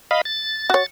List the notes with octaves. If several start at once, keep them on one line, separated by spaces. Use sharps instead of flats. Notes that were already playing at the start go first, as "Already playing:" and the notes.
D#5 F5 B5
A6
F#4 C#5